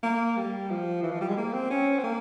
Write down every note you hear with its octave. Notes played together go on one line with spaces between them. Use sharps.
A#3
G3
F3
E3
F3
G3
G#3
A#3
C4
C#4
C4
A#3